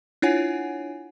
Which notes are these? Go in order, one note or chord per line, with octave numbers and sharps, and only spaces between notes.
D4 E4 F4 C#5 F#5 G#5